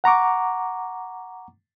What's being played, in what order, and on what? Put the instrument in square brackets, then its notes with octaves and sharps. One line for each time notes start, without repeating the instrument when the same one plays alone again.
[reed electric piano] F#5 A#5 C#6 D6